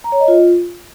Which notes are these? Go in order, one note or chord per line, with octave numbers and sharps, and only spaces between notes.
A#5
C#5
D#5
F4